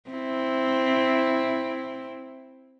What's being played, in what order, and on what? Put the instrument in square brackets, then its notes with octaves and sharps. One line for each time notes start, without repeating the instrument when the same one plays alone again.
[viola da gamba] C4 E4